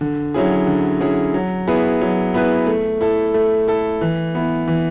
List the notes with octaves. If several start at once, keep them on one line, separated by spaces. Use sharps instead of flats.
D3
F#3 C#4 E4 G#4
D3
F#3 C#4 E4 G#4
F#3
B3 E4 G#4 B4
F#3
B3 E4 G#4 B4
A3
E4 A4
A3
E4 A4
E3
B3 E4
E3